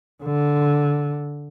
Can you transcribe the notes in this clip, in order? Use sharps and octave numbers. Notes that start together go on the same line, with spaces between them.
D3